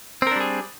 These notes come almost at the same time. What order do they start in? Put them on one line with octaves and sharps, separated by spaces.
C4 A#4 D4 G3 G#4